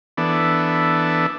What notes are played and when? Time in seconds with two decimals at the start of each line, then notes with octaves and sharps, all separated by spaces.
0.18 E3 B3 D4 A4